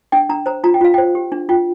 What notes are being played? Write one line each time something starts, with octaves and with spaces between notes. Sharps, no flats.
D4 G5
D4 A#5
C5 A#5
F4 A#5
G5
F4 F5
C5 G5
G4
D4
F4 G5